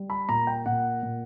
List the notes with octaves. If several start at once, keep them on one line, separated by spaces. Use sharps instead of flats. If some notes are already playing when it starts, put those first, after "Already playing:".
Already playing: G3
B5
A#2 A#5
G5
A#2 F#5
A#2